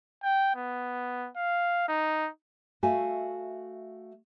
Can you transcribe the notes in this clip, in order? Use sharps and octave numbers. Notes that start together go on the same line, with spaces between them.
G5
B3
F5
D#4
A3 F#4 E5 F5 G#5